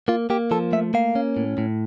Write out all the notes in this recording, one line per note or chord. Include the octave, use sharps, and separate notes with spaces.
A#3 F4
A#3 G4
F3 A4
A3 E5
A#3 F5
C#4
A2
A2